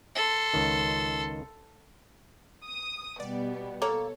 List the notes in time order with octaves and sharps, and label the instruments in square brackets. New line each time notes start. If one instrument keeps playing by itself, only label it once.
[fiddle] A4 C6
[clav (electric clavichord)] C#2 D#3
[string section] D#6
[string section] B2 G3 B3 [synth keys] D5
[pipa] A#3 [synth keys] A4 C#5